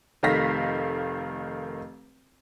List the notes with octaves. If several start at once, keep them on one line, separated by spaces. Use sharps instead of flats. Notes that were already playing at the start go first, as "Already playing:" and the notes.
F1 D#3 A3 F5 A#6 B6